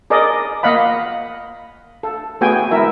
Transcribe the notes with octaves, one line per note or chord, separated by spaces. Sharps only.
G#4 A#4 D5 D#5
A#3 D#5 F5 F#5 B5
A4
A3 B3 F#4 G#4 G5 G#5
G#3 E4 A#4 E5